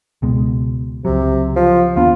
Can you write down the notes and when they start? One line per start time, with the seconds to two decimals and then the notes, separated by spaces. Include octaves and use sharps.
0.22 C#2 B2 G#3
1.05 C#2 C3 F#3
1.56 F3
1.96 D#2 B3 D4 F4